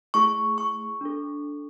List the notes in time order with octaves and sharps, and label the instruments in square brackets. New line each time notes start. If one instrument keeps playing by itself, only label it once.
[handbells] A3 E4 G#4 C#6
C#6
D4 A4